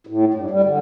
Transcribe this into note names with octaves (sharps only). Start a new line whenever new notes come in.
A2
G2
G3
D3